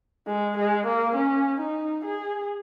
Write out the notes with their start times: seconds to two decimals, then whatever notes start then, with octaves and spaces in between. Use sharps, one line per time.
0.27 G#3
0.56 G#3
0.86 A#3
1.15 C#4
1.59 D#4
2.05 G#4